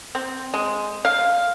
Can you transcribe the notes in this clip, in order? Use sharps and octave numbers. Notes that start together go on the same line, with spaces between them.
C4
G#3
F5